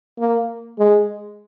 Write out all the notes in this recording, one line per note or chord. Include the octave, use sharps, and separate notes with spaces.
A#3
G#3